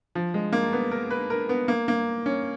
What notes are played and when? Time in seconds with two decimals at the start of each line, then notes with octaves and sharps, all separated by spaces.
0.15 F3
0.34 G#3
0.53 A#3
0.73 B3
0.91 A#4
1.10 B4
1.30 A#4
1.49 B3
1.68 A#3
1.88 A#3
2.26 C#4